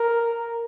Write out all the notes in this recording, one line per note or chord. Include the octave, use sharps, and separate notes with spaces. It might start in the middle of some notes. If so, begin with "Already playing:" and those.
Already playing: A#4